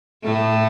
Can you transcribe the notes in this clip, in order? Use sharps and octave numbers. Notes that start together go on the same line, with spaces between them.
A2 A3